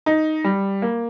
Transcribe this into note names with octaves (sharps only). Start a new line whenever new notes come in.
D#4
G3
A#3